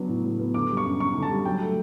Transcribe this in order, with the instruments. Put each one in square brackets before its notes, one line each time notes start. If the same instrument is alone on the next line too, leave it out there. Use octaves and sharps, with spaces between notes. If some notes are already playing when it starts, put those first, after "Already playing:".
Already playing: [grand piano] F#3 B3 D4
A2
F#3
B3
D3 D6
G3
C#6
F#2
F#2 C#6
D3
A5
G3
F#3 G5
A3